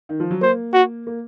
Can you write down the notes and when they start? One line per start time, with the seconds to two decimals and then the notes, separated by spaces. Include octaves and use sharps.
0.09 D#3
0.20 F3
0.31 F#3
0.41 A#3 C5
0.73 F#4
1.07 A#3